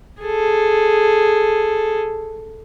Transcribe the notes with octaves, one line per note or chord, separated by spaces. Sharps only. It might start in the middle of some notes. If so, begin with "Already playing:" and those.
G#4 A4